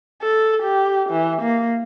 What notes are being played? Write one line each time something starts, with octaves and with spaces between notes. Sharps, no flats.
A4
G4
E3
A#3